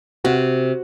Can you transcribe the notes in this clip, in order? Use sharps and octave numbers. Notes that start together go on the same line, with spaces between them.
C3 F#4